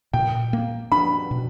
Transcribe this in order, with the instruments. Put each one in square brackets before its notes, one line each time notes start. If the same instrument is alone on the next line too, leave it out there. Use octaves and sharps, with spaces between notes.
[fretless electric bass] A#2 [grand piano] G5
[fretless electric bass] A#3
[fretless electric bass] D4 [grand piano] B5
[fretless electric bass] B2